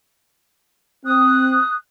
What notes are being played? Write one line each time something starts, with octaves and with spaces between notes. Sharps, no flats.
C4 D#6 F#6